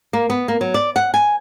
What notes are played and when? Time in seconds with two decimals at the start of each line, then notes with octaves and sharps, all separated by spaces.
0.13 A#3
0.30 B3
0.48 A#3
0.61 F#3
0.74 D5
0.96 F#5
1.14 G#5